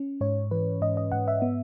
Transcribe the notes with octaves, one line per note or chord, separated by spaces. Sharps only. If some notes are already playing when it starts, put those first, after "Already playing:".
Already playing: C#4
G#2 C#5
E3 B4
G#2 D#5
D#5
G#2 F#5
E5
B3